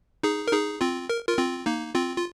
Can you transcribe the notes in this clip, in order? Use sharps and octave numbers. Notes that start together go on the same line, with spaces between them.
D#4 G#4
A#4
D#4 G#4
C4 F4
A#4
F4 A#4
C4 F4
A#3 D#4
C4 F4
F4